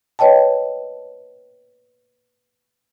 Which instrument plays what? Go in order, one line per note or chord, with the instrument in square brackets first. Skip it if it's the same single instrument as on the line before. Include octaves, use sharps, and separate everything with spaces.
[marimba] B4 C#5 D#5 G5 A5